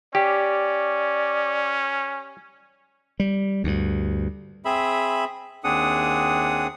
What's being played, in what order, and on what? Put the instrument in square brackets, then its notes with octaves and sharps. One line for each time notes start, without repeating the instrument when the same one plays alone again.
[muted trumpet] C#4 [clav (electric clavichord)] G4 [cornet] D5
[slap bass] G3
D2 G2
[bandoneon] C4 G#4 E5 B5
D#2 C4 D4 G#4 F#5 D#6